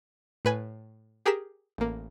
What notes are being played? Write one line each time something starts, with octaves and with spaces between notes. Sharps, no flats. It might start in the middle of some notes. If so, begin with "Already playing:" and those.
A2 B4 G#5
G4 G#4 A#4 B6 E7
A1 A#3